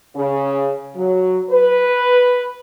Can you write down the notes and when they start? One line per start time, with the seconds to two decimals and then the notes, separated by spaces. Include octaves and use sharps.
0.16 C#3
0.96 F#3
1.51 B4